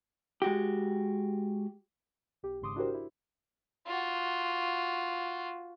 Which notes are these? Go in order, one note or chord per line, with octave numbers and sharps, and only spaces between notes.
G#3 F#4 G4
B1 G4
G#1 G#2 C#3 C6 D6 D#6
D4 E4 F#4 G4 A#4 C5
E4
F4 F#4